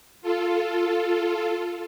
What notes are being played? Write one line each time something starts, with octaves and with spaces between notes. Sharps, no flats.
F4 A4